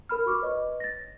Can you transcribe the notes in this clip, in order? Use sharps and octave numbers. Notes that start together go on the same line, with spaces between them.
A#4 B5 F6
F#4 C#6 D6 F6
B4 C#5 D#5
A6 A#6